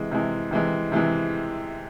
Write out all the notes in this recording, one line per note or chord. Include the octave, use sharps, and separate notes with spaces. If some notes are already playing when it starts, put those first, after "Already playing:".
Already playing: C3 E3 G#3
C3 E3 G#3
C3 E3 G#3
C3 E3 G#3